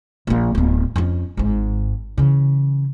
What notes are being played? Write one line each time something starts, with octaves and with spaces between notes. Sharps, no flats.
A#1 A#3
D1 B3
F2 C#4
G#1 G#2
C#3 E3